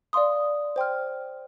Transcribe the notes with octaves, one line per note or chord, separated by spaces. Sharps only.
D5 F5 C6 D#6
C5 G5 C6 F6